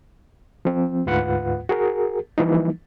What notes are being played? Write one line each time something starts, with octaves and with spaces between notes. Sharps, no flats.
F3 C4
D2 G#2 F4 B4 F#5
F#4 G#4 A#4
E3 F3 G3 A#3 D#4